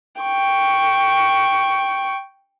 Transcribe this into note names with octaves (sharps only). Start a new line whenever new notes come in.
G5 C#6